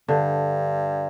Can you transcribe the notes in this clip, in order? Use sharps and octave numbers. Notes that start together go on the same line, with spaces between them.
G2 D3